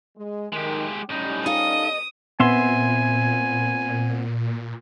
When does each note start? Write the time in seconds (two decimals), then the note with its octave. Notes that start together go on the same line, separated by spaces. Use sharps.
0.17 G#3
0.53 D#3 G#3 G4
1.10 A2 G3 C#4 D#4
1.46 D#4 F4 A4 D#5 D#6
2.40 A#2 B3 C4 E5 G#5 C6